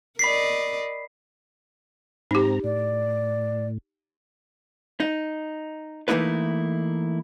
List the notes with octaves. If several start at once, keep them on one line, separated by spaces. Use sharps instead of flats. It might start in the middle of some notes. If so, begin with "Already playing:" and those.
A#4 D5 D#5 B5 B6 C7
G#2 C4 D#4 G4 A#5
A2 D5
D#4
E3 A3 A#3 D#4 E4 B4